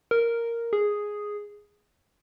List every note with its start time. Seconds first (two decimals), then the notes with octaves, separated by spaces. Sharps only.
0.11 A#4
0.73 G#4